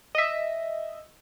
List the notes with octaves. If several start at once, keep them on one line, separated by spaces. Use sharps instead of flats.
D#5 E5